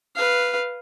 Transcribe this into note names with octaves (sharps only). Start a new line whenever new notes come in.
B4 F5